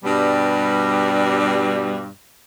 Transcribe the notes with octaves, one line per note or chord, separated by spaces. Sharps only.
G2 B2 G3